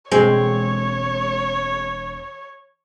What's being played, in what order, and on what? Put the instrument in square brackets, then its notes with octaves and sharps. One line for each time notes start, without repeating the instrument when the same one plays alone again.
[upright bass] E1 [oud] G#3 C4 [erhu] C#5